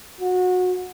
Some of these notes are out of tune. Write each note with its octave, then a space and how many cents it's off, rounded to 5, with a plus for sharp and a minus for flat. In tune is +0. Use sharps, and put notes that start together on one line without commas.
F#4 -25